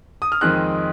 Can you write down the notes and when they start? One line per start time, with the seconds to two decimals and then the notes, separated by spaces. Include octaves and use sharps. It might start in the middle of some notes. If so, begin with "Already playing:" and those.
0.22 D#6
0.32 F6
0.41 F2 D#3 G#3 C4 D#4 F#6